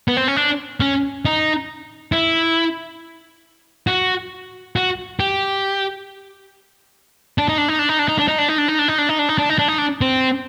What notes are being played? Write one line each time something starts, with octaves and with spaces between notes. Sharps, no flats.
B3
C4
C#4
D4
C#4
D#4
E4
F#4
F#4
G4
D4
D#4
D4
D#4
D4
D#4
D4
D#4
D4
D#4
D4
D#4
D4
D#4
D4
D#4
D4
D#4
D4
D#4
D4
D#4
D4
D#4
D4
C4